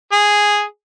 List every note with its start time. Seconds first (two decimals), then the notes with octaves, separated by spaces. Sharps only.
0.12 G#4